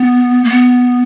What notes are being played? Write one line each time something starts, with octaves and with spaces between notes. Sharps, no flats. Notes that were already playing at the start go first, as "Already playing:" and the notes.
Already playing: B3
A#3
B3